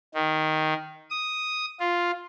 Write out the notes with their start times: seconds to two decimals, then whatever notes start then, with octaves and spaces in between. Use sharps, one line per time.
0.15 D#3
1.10 D#6
1.80 F4